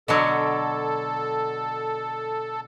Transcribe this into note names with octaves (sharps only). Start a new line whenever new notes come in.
B2 D3 F#3 A4